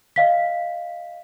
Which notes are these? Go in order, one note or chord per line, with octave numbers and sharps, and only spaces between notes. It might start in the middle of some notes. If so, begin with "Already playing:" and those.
D#5 F5 B6